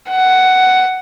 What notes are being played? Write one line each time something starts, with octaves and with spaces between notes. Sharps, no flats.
F#5